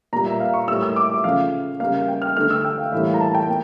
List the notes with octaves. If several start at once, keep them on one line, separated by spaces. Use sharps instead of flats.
A#2 G3 A#3 A#5
E5
F5
C#6
A2 G3 A#3 E6
E6
D6
E5
C#3 F3 A3 F5
C#3 G3 A#3 F5
F5
G5
F6
D3 A3 F6
E6
G5
F5
A2 E3 G3 A#3 E5
F5
A#5
A5
G5
A#3